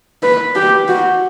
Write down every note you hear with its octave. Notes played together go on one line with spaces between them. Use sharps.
B4
G4
F#4